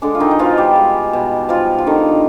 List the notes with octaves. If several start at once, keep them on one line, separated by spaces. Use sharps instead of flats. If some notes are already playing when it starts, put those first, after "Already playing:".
D3 G#3 D4
F4
D#3 D#4
D#4
B2 F3 F4
G3 G4
G#3
B2
F3 G3 F4
F4
D3 D#3 D#4